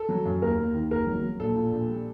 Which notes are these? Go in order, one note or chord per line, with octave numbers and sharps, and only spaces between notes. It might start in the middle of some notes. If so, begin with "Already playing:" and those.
Already playing: A4
F#3
F#2
D#2 A#4
D#2
D#3
F#1 A#4
F#3
F#3
A#1 A4
A#2
A#1
G3